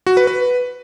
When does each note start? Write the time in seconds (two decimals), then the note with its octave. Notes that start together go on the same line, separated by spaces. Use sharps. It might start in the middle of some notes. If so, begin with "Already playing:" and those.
0.07 F#4
0.17 B4
0.27 B4